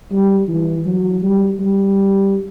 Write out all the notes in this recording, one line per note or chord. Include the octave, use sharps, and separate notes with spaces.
G3
E3
F#3
G3
G3